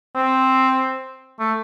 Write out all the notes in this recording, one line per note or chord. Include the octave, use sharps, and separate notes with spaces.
C4
A3